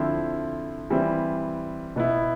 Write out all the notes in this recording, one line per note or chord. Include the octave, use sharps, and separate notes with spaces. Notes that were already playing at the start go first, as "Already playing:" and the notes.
Already playing: D3 F3 C4 E4
E3 G3 C4 E4
B2 B3 E4